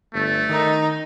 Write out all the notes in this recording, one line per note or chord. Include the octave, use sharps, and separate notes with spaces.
G1 A3
D#3 D#4